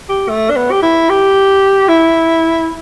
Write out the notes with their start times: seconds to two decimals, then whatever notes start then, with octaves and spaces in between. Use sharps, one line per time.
0.09 G4
0.29 A3
0.50 D4
0.56 B3
0.71 G4
0.82 E4
1.09 G4
1.88 E4